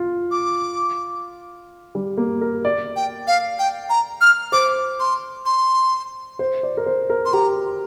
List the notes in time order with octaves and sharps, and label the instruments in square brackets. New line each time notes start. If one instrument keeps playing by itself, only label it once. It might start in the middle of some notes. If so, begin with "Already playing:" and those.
Already playing: [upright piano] F4
[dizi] D6
[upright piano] G3
A#3
A#4
D5
[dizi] G5
F5
G5
A#5
F6
[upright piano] C5 [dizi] D6
[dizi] C6
C6
[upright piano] C5
D5
A#4
C5
A#4
[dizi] C6
[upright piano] G4 [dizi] A#5